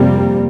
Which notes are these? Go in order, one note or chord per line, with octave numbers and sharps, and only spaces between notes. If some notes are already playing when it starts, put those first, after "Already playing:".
Already playing: F2 C3 G3 A#3